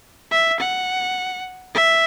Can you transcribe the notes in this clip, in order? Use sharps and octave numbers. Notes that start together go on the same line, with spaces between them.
E5
F#5
E5